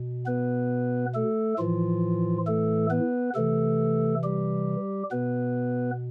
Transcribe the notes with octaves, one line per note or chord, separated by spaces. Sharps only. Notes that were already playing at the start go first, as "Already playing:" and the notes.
Already playing: B2
B3 B4
A3 A4
A2 E3 F3 F4
A3 A4
B3 B4
C3 E3 A3 A4
G3 G4
B2 B3 B4